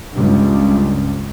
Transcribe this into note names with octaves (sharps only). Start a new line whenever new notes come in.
C#2 G2